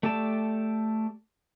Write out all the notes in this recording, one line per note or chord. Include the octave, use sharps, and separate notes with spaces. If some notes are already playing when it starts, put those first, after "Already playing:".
A3 G4 A4 D5 A5